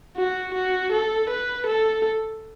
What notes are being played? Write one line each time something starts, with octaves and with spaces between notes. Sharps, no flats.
F#4
F#4
A4
B4
A4